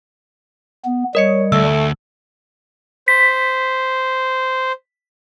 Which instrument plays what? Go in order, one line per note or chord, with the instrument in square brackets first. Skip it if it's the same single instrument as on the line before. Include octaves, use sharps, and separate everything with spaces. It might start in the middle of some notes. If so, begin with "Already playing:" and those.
[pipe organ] B3
[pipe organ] G3 [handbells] A#4 D#5 C#7 [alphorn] C#5
[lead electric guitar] D2 [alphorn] A3 [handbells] E6
[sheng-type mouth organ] C5 [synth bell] B6